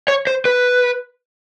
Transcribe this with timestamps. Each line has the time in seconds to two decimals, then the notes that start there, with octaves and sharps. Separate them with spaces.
0.08 C#5
0.27 C5
0.45 B4